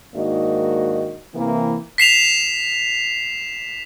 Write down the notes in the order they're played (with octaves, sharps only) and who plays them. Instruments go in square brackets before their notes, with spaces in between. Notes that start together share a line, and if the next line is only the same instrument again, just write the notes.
[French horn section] G#2 D#3 A#3 D4 F#4 D#5
C3 E3 A#3
[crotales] B6 C7 E7 F7